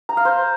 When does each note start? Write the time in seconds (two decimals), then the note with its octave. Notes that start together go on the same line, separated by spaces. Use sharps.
0.09 A#5
0.17 F5
0.25 C5